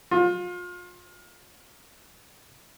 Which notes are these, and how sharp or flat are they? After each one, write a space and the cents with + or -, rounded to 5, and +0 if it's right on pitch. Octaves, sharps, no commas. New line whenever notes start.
F4 +30